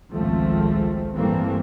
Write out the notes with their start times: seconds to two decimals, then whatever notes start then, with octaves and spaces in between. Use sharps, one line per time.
0.10 G#1 C#2 F3 A3 C4
1.14 G2 E3 G3 A3 A#3 C4